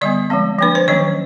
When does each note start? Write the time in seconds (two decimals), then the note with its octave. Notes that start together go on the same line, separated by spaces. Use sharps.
0.01 D3 G3 B3 D5
0.30 F3 G#3 C4
0.59 F3 A#3 D4 B4
0.75 C5
0.88 D#3 F#3 A#3 C#4 C#5